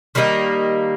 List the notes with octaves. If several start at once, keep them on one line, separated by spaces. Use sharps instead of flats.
D#3 G3 A#3 D#4